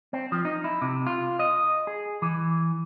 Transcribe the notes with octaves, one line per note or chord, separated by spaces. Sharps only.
C4
F3
D#4
E4
C3
F4
D#5
G#4
E3